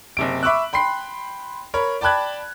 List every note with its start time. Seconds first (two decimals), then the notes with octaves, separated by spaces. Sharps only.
0.17 F#1 C3 D7
0.43 E5 B5 C#6 D6 E6 F#6
0.73 G5 B5 C6 C7
1.74 A#4 C#5 B5
2.01 D5 G5 A5 B5 F#6 G#6